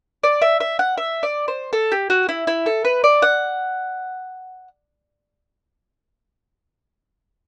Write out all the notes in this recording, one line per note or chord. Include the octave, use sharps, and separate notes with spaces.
D5
E5
E5
F#5
E5
D5
C5
A4
G4
F#4
E4
E4
A4
B4
D5
F#5